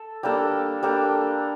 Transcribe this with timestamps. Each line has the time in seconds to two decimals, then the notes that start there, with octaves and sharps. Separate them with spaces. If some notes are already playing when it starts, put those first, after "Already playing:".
Already playing: A4
0.23 G3 A#3 D4 A4
0.83 G3 A#3 D4 A4